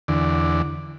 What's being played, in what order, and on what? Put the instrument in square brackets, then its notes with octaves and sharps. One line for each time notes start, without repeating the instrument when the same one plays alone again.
[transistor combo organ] E2 D3